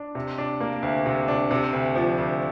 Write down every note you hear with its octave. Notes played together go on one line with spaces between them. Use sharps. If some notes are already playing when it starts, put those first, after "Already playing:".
Already playing: D4
C3
D4
A#3
D2
C3
D4
C3
D2
F3
D2